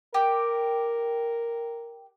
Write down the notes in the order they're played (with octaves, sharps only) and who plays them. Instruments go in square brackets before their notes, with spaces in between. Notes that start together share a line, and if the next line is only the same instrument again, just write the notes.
[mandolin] G4 [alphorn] A#4